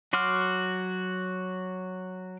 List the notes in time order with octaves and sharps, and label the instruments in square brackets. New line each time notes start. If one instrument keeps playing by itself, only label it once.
[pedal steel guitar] F#3 F#4 C6 D6 F6